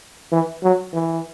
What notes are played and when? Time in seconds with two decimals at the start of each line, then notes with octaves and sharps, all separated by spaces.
0.32 E3
0.64 F#3
0.93 E3